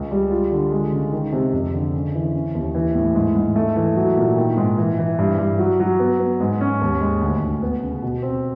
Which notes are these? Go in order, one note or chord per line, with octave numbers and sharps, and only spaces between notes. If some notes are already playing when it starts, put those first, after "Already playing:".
Already playing: C#2
G3
F4
D3
G#3
C#3
D#3
C3
F2
D3
C#3
E3
C#4
D#2
E3
A2
G#2
G#2
A3
E3
F#3
A#2
D#3
G#2
E3
E3
G2
G2
F#3
F#3
B3
B3
G#2
C#4
D#2
G#3
D2
D2
B3
C#3
B2
C4